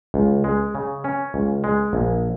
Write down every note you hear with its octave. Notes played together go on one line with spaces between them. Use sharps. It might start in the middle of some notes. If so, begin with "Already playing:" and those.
C#2
G#3
C#3
C#4
C#2
G#3
A#1